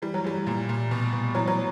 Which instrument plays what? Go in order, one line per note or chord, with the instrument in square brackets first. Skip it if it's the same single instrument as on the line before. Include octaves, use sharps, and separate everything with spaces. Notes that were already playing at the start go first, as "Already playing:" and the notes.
[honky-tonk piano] E3 G3
F#3
E3 G3
A#2
A#2
B2
B2
E3 F#3
F#3